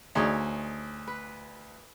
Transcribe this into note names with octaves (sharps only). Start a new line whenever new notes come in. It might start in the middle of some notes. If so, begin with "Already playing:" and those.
D2 D#4 G#4 C#5
B4